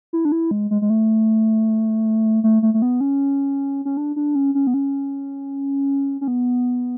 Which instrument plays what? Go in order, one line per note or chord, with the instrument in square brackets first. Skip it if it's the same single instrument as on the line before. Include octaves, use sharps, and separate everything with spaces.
[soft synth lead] E4
D4
E4
G#3
G#3
G#3
A3
A3
A3
A3
B3
C#4
C#4
D4
D4
C#4
C#4
B3
C#4
C#4
B3